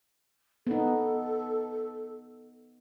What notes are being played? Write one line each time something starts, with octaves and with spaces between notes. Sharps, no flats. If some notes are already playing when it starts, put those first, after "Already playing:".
B3 D#4 A4